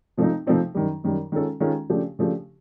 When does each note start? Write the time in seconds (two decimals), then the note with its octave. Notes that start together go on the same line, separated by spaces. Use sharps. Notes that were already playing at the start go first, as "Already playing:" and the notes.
0.17 C3 F3 A3 C4 D#4
0.47 C3 F3 A3 C4 D#4
0.75 F#2 D#3 G3
1.04 F#2 D#3 G3
1.32 D#3 G#3 C#4 F4 A4
1.60 D#3 G#3 C#4 F4 A4
1.90 C#3 F3 A3 D4 G4
2.19 C#3 F3 A3 D4 G4